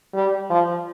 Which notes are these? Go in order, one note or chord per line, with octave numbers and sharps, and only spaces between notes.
G3
F3